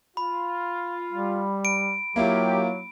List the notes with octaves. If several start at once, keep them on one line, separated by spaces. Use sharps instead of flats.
F4 B5
G3
D7
F#3 A#3 E4 F4 G4